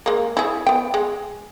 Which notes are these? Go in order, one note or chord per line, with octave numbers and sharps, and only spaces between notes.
G#3 A#3
E4 G#4
B3 G5
G#3